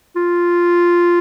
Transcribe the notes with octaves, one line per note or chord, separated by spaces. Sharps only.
F4